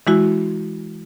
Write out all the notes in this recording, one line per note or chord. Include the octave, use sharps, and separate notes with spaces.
E3 G#3 E4 F#4